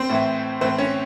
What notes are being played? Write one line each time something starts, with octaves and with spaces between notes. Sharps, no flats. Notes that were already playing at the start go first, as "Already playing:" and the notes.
Already playing: C4 C5
A2 E3
A2 E3 C4 C5
C#4 C#5